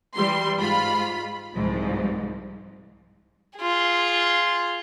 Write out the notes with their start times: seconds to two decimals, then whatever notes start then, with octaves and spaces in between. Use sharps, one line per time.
0.15 E3 G3 C6
0.57 G#2 F4 B5
1.55 C2 G#2 F3
3.59 F4 G#4